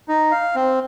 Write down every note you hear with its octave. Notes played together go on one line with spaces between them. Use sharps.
D#4
F5
C4